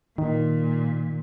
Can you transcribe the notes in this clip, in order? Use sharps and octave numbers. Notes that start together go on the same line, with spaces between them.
A#2 D#3